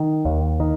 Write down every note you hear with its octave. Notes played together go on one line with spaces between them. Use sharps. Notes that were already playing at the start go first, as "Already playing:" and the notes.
Already playing: D#3
D#2
D#3